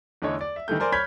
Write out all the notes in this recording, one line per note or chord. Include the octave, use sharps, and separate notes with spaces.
E2 D3 A3 D#4 C#5
D5
E5
D#3 E3 G3 A3 G6
A#4 C5 D5 G#5
C#5 B5 F6 G6 G#6 B6